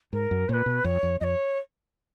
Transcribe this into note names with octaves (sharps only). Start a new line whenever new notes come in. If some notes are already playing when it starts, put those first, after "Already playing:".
G#2 A#4
F#2
A#2 B4 C#5
B2
F2 C#5
F2
F2 C#5 D#5